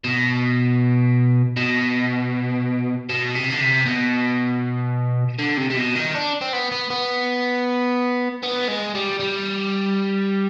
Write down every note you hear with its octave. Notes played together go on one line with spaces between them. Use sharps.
B2
B2
B2
C3
D3
C3
B2
D3
C3
C3
B2
D#3
D4
C4
B3
B3
B3
B3
G#3
G3
G3